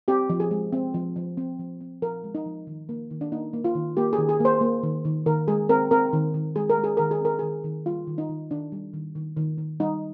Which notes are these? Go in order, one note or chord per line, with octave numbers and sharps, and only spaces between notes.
C4 G4
F3
G#4
G#3
C4
F3
F3
C4
F3
C4
F3 A#4
G#3
D#4
F3
D#3
A#3
D#3
D4
A#3 D#4
A#3
F4
D#3
A#3 G4
G#4
D#3
G#4
A#3
C5
A#3
D#3
D#3
D#3 A#4
G#3 G#4
C4 A#4
C4 A#4
D#3
D#3
G#3 G#4
A#4
G#3
G#4
D#3 A#4
G#4
C4 A#4
D#3 G#4
D#3
G3 F4
D#3
D#4
D#3
D#3 D4
G3
D#3
D#3
D#3
D#3
G3 D#4